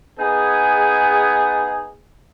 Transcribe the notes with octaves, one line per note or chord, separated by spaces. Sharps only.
B3 D#4 G#4